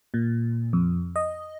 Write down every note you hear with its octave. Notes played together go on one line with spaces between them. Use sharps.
A#2
F2
D#5